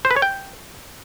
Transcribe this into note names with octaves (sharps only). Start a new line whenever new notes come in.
C5
B4
C#5
G5